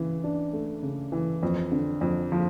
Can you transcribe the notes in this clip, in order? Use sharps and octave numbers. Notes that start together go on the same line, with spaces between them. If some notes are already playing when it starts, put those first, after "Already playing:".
Already playing: C#3 E3
D4
A3
C#3
E3
F2
D3
F2
F3